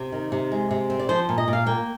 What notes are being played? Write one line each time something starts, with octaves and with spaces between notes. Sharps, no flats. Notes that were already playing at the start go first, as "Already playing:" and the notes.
Already playing: C3
D#3
C3
G#3
C3
C4
D5
F3 C5
A#2
D#5
A#2
F5
A#3 G5